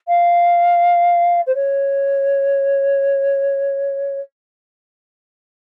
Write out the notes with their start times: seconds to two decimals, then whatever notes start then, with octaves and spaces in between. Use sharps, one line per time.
0.08 F5
1.47 C5
1.55 C#5